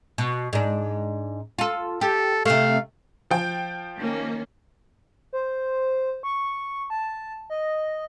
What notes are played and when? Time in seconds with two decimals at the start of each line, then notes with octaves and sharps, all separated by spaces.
0.18 B2
0.53 G#2 D4
1.58 F4 A4
2.01 G4 A4
2.45 C3 A3 F5
3.30 F3 G5
3.97 D#3 A#3 C#4
5.33 C5
6.23 C#6
6.90 A5
7.50 D#5